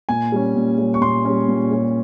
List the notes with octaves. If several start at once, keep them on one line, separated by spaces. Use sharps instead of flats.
A#2 G#5
G3 C#4
A#2
G3 C#4
C#6
A#2 C6
G3 C#4
A#2
G3 C#4